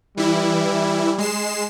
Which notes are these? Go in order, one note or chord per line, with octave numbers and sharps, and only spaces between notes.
E3 G3 E4
G#3 C7 E7